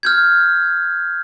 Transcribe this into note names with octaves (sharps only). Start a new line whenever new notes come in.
F6 G6 G#6